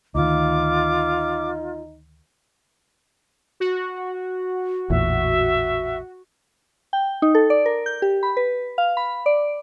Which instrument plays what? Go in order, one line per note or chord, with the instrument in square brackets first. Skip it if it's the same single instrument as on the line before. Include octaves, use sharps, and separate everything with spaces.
[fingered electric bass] D2 D#3 [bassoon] D#4 [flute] F4 [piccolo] D6
[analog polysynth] F#4
[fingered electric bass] A1 E2 A#2 [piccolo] E5
[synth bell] G5
D#4
A4
D5
A#4
G6
G4
B5
B4
F5
B5
D5